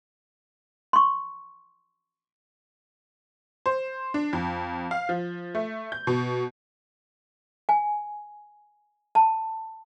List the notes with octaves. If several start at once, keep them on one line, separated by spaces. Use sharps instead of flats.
C6 C#6
C5
D4
F2
F5
F3
A3
G6
B2
G#5
A5